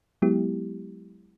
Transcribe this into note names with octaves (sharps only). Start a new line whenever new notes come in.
F#3 G#3 B3 E4 G4